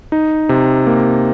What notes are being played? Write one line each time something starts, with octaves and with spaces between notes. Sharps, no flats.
D#4
C3
A#3